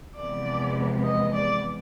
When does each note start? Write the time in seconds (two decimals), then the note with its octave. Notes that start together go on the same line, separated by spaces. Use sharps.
0.16 E2 C3 F3 G#3 B3 D5
1.04 D#5
1.33 D5